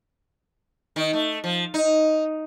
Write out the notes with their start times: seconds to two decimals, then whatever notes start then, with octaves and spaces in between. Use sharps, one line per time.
0.96 D#3
1.13 A3
1.44 F3
1.74 D#4